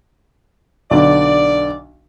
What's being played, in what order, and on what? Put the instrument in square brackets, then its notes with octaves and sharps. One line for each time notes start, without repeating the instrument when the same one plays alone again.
[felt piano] B1 D3 [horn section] D5